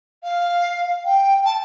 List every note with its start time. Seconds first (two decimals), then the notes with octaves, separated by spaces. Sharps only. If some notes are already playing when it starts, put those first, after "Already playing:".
0.23 F5
1.05 G5
1.45 A5